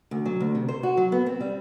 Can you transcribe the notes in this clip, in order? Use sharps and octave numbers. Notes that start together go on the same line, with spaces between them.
D2
F#3
D2
C3
C5
F#4
F#3
B3
C4
G3